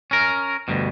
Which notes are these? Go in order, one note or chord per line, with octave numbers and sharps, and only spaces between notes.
C#4 A#4
D2 G2 B2